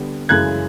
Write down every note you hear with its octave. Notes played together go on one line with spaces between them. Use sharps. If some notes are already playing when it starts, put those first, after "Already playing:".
Already playing: D3 G3 B3
F#2 C#3 E3 G#3 F#6 G#6